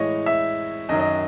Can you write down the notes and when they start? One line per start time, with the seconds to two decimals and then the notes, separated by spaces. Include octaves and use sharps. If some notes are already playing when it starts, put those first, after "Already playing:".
Already playing: A2 E3 G#3 C#5 D#5
0.26 E5
0.89 F#2 D#3 F#3 D#5
1.00 D#5